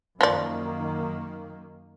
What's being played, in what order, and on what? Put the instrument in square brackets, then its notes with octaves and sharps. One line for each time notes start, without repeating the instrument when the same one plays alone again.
[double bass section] F#2 D#3 A#3 [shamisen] F3 D5